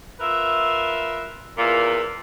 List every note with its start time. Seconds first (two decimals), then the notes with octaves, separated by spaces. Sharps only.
0.20 F4 A#4 B4 E5
1.58 E2 A#2 A#3 F4 E5